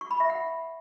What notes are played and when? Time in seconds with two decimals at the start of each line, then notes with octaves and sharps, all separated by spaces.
0.01 C#6
0.11 B5
0.20 E5
0.30 F#5